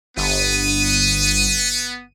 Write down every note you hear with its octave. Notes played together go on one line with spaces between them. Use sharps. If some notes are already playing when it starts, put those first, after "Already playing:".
G1 B3 D#7